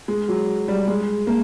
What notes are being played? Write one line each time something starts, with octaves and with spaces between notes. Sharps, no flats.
G#3
F#3
G3
G#3
A#3